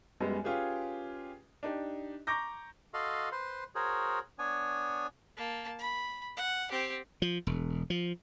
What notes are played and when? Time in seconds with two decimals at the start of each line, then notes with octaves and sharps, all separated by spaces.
0.20 F#2 G3 G#3 B3
0.44 C#4 F4 G4 G#4 B4
1.63 D4 D#4 G4
2.27 A#5 C#6 D6 G6 A#6
2.94 F#4 A4 D#5 F5 C6
3.32 B4 C5 C6
3.75 F#4 G#4 A#4 C5 C#5
4.39 B3 D4 C#5 G#5
5.37 A#3 A5
5.79 B5
6.37 F#5
6.71 C4 G4
7.22 F3
7.47 E1
7.90 F3